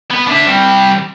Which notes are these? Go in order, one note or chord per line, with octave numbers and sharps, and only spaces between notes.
B3
D4 E5
C3 G3